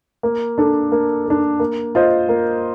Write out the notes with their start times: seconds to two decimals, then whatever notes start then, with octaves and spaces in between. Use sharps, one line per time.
0.23 A#3
0.58 D4 A4
0.92 A#3
1.26 D4 A4
1.60 A#3
1.95 F4 C5 D#5
2.29 A#3